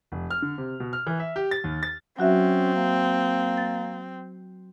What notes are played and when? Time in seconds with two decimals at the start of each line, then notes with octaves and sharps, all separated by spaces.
0.12 F1
0.31 F6
0.42 D3
0.58 C3
0.80 B2
0.93 F6
1.07 E3
1.19 E5
1.36 G4
1.51 A6
1.64 D#2
1.83 A6
2.19 F#3 C4 C#4 F#4 E5
2.75 A#3
3.57 A6